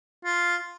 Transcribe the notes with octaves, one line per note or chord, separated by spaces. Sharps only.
F4